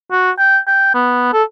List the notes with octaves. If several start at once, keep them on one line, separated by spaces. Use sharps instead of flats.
F#4
G5
G5
B3
A4